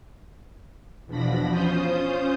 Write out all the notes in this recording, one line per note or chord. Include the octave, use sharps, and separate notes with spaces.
E2 B2 F3 D4 B5 A#6
C#4 F4 C5 D#6 G6